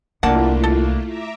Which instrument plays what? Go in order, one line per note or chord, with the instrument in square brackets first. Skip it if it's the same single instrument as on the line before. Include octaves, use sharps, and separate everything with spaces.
[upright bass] C2 [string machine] A3 E4 F4 [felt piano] A#3 D4 [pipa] F#5 A5
[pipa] A4
[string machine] E5 A#5 D6